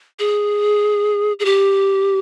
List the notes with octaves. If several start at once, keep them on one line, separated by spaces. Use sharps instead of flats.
G#4
G#4
G4